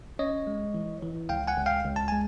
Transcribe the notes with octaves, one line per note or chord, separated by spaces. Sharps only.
C#4 C#5 D#5
G#3
E3
E3
C#2 F5 G5
F#5 G#5
C#2
F5 G5
C#2
A5
G#3 G#5